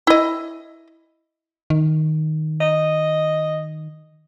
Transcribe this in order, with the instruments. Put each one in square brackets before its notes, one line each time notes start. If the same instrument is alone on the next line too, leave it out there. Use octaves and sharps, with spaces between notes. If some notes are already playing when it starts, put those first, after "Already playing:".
[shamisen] E4 D#5
[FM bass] D#3
[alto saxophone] D#5